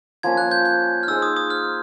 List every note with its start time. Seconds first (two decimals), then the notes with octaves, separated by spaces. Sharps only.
0.23 F3 A#3 C#4 G#6
0.37 F#6
0.51 G6
0.65 G6
1.03 F6
1.07 D#4 G#4 C5 E6
1.22 D#6
1.37 D#6
1.50 F6